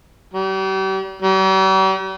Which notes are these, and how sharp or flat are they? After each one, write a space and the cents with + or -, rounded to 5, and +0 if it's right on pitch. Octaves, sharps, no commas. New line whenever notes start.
G3 -40
G3 -45